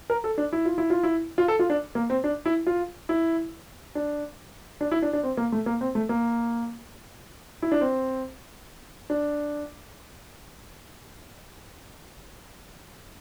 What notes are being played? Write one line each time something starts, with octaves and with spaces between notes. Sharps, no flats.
A#4
A4
D4
E4
F4
E4
F4
E4
F4
A4
F4
D4
A#3
C4
D4
E4
F4
E4
D4
D4
E4
D4
D4
C4
A#3
A3
A#3
C4
A3
A#3
E4
D4
C4
D4